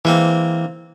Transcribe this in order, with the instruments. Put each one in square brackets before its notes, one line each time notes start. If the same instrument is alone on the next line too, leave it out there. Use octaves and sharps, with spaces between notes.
[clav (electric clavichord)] E3 [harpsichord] G#3 A#3 C4